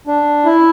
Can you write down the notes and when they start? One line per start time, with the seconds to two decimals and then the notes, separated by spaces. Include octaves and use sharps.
0.07 D4
0.45 E4